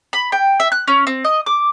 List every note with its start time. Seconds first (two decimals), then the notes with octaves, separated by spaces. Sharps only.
0.13 B5
0.32 G5
0.60 E5
0.72 F#6
0.88 C#4
1.07 C4
1.25 D#5
1.46 D6